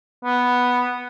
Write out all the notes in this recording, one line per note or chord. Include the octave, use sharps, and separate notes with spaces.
B3